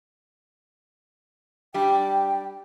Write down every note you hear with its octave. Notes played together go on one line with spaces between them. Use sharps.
G3 D4 G4 G5